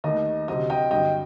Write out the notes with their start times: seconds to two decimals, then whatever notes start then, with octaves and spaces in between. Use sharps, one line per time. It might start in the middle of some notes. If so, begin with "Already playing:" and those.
0.04 D#2 D#3 A3 D#5
0.48 D2 C3 F#3 C4 G4 D#5
0.70 D#5 G5
0.91 G2 D3 F#3 D#5 G5